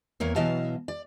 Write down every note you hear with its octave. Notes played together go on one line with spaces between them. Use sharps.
E2 A#3 A#4 C#5
B2 E3 F#3 D#5 F5 A5
D5